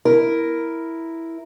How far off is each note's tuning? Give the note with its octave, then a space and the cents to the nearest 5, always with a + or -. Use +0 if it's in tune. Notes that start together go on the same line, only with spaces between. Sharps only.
E4 +0 A#4 +0